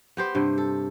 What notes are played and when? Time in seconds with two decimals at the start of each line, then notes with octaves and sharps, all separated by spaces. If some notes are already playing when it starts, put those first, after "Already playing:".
0.17 B3 G4 C5
0.35 G2 C3
0.58 A4